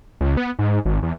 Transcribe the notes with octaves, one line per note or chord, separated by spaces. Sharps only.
C#2
B3
G#2
G#1
E2